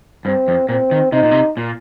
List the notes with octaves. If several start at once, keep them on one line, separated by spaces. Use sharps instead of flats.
G2 C4
F2
A#2 C4
D#3
C3 D#4
A#2
C3
A#2